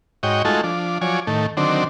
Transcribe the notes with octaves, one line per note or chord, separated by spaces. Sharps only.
G#2 F#4 C#5 D#5 G5
G#3 A3 D#4 F4 F#4 A4
F3 D4
F3 F#3 C#5 D5 G#5
A2 D#3 A3
D3 D#3 F#3 C4 D4